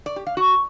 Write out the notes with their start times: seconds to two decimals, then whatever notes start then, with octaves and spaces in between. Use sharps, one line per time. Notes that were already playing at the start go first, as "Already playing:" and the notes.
0.06 D5
0.16 G4
0.27 F5
0.37 F#4